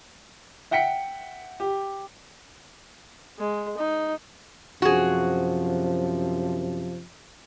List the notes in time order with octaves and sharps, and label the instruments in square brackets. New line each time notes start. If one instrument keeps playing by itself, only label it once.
[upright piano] E5 F#5 G5 B6 C#7
G4
[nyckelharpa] G#3
D#4
[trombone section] F#2 C3 F3 [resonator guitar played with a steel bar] F#4 G#4